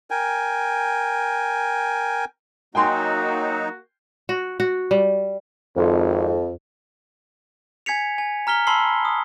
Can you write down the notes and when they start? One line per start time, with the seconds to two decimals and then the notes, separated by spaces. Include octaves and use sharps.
0.11 A#4 G5 G#5
2.75 F#3 A#3 D#4 F#4 G5 G#5 C6
4.29 F#4
4.60 F#4
4.91 G3
5.77 G#1 F2
7.86 G#5 G#6 B6 C#7 F7
8.18 G#5
8.47 A#5 F6 B6 G7
8.67 A5 B5 C6 E6 C7 G7
9.05 D#6